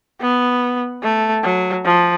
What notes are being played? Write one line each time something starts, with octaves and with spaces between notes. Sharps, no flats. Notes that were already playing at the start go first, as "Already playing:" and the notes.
B3
A3
F#3
F3